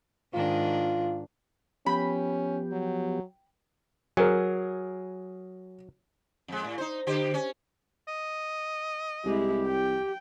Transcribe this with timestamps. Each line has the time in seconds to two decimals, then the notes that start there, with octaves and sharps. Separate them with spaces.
0.34 G#2 D#3 D4 F4
1.86 F3 B3 C#4 G4 G5 B5
2.72 F#3
4.17 F#3 G#4 A#4
6.48 F2 G#3
6.64 A2
6.78 D#4 C5
7.07 D3 G4 C5
7.34 C#4
8.08 D#5
9.25 C2 G#3 E4 G4
9.68 G5